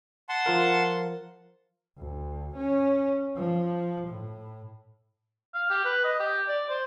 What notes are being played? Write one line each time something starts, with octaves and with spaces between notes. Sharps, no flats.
F#5 A5 C6
F3 F4 A#4
D2
C#4
F3
A2
F5
G4
B4
D#5
G4
D5
C5